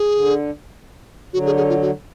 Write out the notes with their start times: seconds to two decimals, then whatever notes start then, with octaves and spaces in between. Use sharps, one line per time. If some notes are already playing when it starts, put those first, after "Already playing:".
Already playing: G#4
0.15 D3
1.33 D3 F#3 F#4
1.46 G#4
1.57 G#4
1.69 F4
1.82 F#4